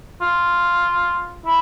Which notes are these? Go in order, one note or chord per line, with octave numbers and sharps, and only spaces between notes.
F4
E4